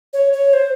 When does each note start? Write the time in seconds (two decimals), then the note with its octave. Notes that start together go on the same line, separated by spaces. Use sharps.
0.13 C#5
0.33 C#5
0.53 C5